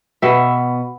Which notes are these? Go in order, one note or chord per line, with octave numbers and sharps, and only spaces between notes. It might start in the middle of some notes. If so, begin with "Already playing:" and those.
B2 B3 E5